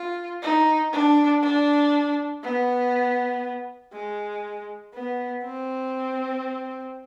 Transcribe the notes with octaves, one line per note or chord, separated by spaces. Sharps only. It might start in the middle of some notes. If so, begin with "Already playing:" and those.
Already playing: F4
D#4
D4
D4
B3
G#3
B3
C4